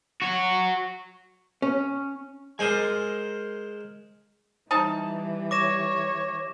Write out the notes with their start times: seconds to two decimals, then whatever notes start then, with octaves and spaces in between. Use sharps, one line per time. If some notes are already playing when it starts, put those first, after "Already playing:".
0.22 F#4 C#5
1.62 C#4
2.59 G#3 A#4 C5 G#5 D#6
4.71 E3 G3 D#4 A5
5.51 C#5 D6 A#6 E7